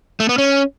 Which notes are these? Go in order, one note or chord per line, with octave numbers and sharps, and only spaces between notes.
A3
B3
C#4